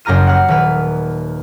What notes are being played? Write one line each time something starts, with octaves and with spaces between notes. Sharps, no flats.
F#1 F#2 G4 A#5 F6 D#7
F#5 F6
D#1 D#3 B4 F6